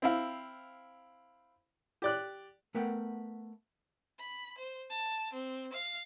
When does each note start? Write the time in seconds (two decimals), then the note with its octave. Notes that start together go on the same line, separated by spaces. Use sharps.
0.02 C4 E4 F5
2.02 G4 D5 F#6
2.75 A3 B3 A#4 B4 F#5 G5
4.19 B5
4.58 C5
4.90 A5
5.33 C4
5.73 F5